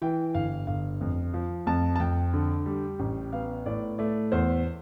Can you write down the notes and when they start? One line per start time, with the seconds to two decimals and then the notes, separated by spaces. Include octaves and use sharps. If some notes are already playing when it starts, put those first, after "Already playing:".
0.02 E3 G5
0.34 G1 F5
0.67 G1 F5
1.01 F2
1.34 F3
1.67 F2 A5
1.96 A5
2.00 F2 G5
2.33 D3
2.66 G3
2.99 A1
3.33 B3 F5
3.66 A2 D5
3.98 A3 D5
4.32 E2 C5